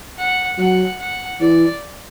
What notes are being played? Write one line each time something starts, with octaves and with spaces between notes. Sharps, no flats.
F#5
F#3 F#5
F#5
E3 D5